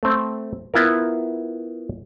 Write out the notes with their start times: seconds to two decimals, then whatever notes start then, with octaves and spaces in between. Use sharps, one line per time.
0.03 A3 C4
0.74 B3 E4 F4 A#4